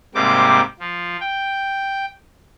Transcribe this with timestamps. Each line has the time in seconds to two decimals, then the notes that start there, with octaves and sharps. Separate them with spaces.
0.15 G#2 C3 G3 A#3 D6
0.79 F3
1.20 G5